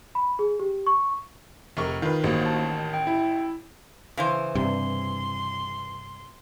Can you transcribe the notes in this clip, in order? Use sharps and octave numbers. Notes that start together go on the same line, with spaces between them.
B5
G#4
G4
C#6
F1 A#4 C#6
D#3 F4 B4
A1 A#3 F#4 C5
A5
G5
E4
C#3 E3 C5
G2 C3 C6